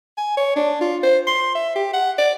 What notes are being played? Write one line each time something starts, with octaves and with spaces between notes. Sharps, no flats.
G#5
C#5
D4
F4
C5
C6
E5
G4
F#5
D5